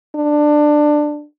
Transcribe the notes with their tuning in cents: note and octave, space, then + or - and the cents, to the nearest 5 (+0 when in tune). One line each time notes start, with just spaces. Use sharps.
D4 +15